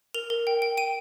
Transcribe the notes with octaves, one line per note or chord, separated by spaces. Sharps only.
A#4 F7
A#4
G5
G5
G5 D#7